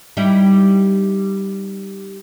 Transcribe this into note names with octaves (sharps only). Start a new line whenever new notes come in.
G3 D#4 E4